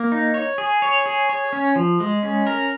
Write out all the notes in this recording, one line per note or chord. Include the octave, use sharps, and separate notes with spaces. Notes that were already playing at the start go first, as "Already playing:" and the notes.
Already playing: A#3
D#4
C#5
G#4
C#5
G#4
C#5
C#4
F3
G#3
C#4
A#4